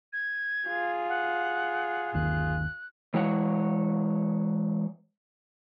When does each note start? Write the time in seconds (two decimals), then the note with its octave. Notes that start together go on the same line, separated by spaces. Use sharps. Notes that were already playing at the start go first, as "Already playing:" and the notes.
0.13 G#6
0.68 F4 G#4
1.09 F#5
2.14 G1 D#2 D#3 F#6
3.14 E3 G#3 C#5 F#5